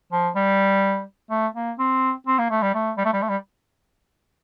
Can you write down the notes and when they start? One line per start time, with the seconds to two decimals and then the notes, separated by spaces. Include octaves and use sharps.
0.12 F3
0.35 G3
1.31 A3
1.55 A#3
1.79 C4
2.27 C4
2.38 A#3
2.50 A3
2.62 G3
2.75 A3
2.97 G3
3.05 A3
3.13 G3
3.22 A3
3.29 G3